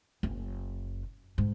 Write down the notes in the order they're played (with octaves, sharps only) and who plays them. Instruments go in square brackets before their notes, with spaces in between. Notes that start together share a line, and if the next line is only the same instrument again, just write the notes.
[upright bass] F#1
G#2